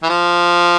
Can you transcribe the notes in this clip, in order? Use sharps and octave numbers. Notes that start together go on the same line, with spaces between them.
E3
F3